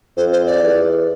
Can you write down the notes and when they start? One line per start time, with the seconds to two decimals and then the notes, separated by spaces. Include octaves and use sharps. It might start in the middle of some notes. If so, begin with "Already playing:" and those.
0.17 F2 C5
0.32 C5
0.47 D5
0.62 E2